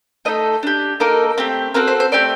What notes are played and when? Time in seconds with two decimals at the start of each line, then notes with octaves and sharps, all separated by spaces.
0.25 A3 D#4 A4 D#5
0.63 D4 G4
1.00 A#3 D#4 A4 A#4
1.38 A3 C4 G4
1.74 C4 F#4 A4 A#4
1.87 C5
2.00 C5
2.12 A3 C4 G4 D5